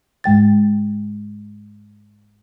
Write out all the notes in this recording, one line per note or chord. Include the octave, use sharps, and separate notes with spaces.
G#2 G#3 G5 A6